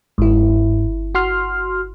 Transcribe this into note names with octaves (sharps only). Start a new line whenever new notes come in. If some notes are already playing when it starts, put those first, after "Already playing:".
G1 G#2 E4
F#4 C6 F6